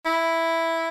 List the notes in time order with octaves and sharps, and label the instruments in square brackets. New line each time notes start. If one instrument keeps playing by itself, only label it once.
[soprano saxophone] E4